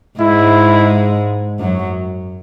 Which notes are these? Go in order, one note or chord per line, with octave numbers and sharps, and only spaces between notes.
G#2 G#3 E4
F#2 F#3